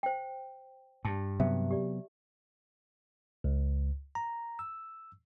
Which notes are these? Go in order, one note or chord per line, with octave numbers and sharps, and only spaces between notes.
C5 G5
G2 A5
C3 F#3 B3 E5
G4 D5
C#2
A#5
E6